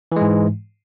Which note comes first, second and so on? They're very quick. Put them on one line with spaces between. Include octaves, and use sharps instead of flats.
E3 G#3 G#2